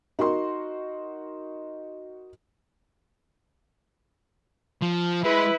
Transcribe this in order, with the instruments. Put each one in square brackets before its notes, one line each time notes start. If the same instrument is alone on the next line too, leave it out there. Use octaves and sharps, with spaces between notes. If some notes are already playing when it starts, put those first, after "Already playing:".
[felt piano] D#4 F#4 A#4 C6
[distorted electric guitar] F3
[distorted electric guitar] G#3 [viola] E4 B4